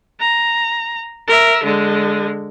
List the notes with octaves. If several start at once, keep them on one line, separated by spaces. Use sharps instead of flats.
A#5
A#4 E5
D3 G#3